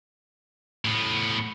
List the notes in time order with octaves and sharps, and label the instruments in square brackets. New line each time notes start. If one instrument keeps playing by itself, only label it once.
[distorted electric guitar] A2 B3